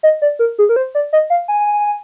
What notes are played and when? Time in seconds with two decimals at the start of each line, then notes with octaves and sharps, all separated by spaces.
0.03 D#5
0.22 D5
0.39 A#4
0.59 G#4
0.69 A#4
0.76 C5
0.95 D5
1.13 D#5
1.30 F5
1.48 G#5